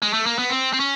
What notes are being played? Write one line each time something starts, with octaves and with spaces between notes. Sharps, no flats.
G#3
A3
A#3
B3
C4
C4
C#4